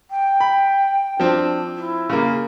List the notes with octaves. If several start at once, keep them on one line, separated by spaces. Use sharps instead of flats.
G5
B5
F3 C4 D4
E4
C#3 A#3